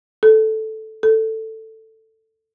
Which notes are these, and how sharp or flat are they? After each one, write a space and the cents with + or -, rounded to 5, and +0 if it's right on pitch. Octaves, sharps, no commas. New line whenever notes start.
A4 -5
A4 +10